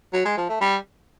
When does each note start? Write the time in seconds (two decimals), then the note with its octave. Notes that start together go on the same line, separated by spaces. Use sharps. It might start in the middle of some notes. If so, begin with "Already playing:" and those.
0.13 F#3
0.25 G#3
0.37 F3
0.49 A3
0.61 G3